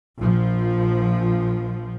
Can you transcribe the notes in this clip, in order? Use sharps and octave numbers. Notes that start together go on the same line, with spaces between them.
A#1 F3